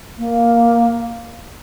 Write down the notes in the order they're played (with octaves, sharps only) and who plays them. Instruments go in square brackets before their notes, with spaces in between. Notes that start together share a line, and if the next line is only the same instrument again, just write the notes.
[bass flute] A#3